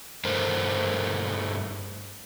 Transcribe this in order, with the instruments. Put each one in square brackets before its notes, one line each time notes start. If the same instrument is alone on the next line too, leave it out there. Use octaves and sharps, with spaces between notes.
[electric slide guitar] G2 A3 A#4 C5